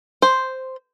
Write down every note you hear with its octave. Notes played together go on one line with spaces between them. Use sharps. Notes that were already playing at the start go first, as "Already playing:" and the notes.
C5